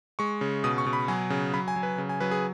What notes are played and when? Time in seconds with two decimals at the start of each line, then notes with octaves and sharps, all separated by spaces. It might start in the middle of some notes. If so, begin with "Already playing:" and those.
0.19 G#3 C#6
0.41 C#3
0.64 B2 D#6
0.78 C#6
0.86 B2
0.93 B5
1.08 F#3 G#5
1.30 C#3
1.54 F#3 B5
1.68 G#5
1.76 F#3
1.83 B4
1.98 C#3
2.09 G#5
2.20 F#3 B4
2.31 G#4